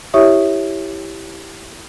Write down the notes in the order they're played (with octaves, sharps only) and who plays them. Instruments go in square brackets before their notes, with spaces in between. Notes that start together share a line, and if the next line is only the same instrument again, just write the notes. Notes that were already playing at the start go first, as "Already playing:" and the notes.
[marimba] E4 G4 C#5 E5 C#6 D#6